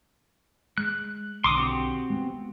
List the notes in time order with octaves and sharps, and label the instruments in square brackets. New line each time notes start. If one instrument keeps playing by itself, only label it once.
[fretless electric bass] G#3 [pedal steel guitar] F#6
[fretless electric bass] B1 D3 [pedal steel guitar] C6 D6 D#6
[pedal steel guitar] C4 F#4 G4
[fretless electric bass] G#3 B3